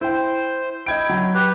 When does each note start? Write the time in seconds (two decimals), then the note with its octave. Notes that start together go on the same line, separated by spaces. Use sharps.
0.01 E4 C5 G5
0.86 E4 D#5 G5 G#6 D7
1.09 F#3
1.34 G4 B4